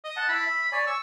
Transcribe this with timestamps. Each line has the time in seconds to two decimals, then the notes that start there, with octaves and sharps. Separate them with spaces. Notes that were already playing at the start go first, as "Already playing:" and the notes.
0.04 D#5
0.17 F#5 A5
0.29 E4 A5 B5
0.46 E5
0.72 C#5 D5 G#5
0.87 C#6 E6